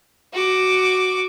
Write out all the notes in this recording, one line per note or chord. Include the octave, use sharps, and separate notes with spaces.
F#4 D6